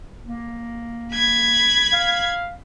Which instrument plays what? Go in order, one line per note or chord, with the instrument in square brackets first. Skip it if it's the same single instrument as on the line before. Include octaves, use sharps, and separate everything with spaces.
[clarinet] A#3
[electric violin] B5 G#6
[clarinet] F5